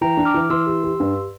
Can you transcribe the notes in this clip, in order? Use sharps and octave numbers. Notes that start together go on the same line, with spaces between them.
E3 G5 A#5
D4
D6 F6
E3
E3 C6 E6
G4
G4
G2